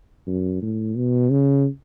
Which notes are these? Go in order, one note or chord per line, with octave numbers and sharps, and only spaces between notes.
F#2
A2
B2
C#3